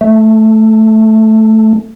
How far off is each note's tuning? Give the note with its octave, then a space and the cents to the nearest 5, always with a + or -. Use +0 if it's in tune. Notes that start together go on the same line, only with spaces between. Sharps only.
A3 -5